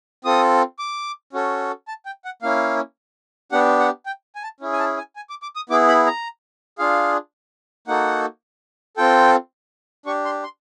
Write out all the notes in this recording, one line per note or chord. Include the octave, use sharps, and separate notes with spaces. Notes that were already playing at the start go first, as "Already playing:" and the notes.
C4 F4 A4 D#6
D6
C#4 F#4 A4
A5
G5
F#5
A#3 C#4 E4 F5
B3 D4 G4 F#5
F#5
G5
G#5
A5
C#4 E4 G#4
G#5
A5
G#5
G#5
D6
D6
D#6
B3 E4 G#4 D6
B5
A#5
D4 F4 G#4 F5
A#3 D#4 F#4 A4 F#5
C4 F4 A4 G5
D4 G4 C#6
C6
C6